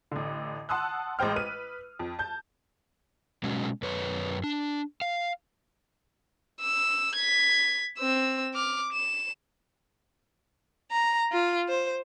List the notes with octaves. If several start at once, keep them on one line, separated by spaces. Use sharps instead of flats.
A1 D3
F#5 A5 C6 D#6 E6 F#6
A1 G#3 C5 G5 F6
B4 D#7
F2
A5 G6
B2 F#3 G#3 C#4
F#2 B4 C#5
D4
F5
E6
G#6 B6
C4 E6
D6 F6
E7
A#5
F4
C5